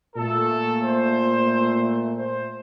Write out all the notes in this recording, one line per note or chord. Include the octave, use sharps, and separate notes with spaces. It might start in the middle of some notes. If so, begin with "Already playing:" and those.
A#2 A3 A4
C5
C5